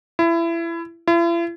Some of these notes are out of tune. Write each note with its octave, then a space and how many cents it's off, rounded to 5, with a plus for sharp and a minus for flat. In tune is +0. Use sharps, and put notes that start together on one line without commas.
E4 +25
E4 +45